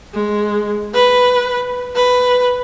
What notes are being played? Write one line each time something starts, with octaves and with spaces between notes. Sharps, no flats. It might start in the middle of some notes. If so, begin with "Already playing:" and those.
G#3
B4
B4